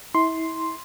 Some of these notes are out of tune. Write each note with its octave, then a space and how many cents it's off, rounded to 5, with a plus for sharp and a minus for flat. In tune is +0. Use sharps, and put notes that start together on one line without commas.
E4 -30 C6 +0